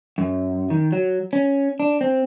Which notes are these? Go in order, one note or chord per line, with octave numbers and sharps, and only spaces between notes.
F#2
D#3
F#3
C#4
D4
C4